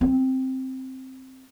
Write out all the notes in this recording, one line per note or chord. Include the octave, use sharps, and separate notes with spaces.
C4